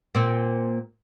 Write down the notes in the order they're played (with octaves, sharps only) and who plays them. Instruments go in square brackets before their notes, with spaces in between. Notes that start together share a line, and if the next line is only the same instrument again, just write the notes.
[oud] A#2 C4